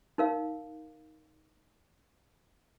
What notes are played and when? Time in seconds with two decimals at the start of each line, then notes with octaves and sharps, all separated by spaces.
0.18 D#4 A#4 F5